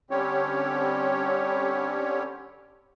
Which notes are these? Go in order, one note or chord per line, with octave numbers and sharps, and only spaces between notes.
D3 G3 C4 C#4 G4 C#5